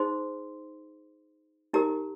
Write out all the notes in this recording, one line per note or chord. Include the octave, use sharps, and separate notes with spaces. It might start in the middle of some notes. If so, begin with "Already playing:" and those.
Already playing: D#4 G#4 C5 C6
D#4 G4 A#4 A#5